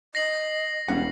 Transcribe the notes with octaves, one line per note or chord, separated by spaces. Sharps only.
D#5 A#6 C7 F#7
E1 G3 C#4 F#5